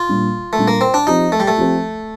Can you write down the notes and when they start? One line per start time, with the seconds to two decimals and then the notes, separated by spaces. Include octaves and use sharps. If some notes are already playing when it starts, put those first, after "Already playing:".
Already playing: F4
0.09 A#2 G3 D4
0.53 A3
0.58 A#2 G3 D4
0.68 A#3
0.81 C4
0.94 D4
1.07 F3 C4 D#4 G4
1.32 A3
1.40 G3
1.48 A3
1.57 F3 C4 G4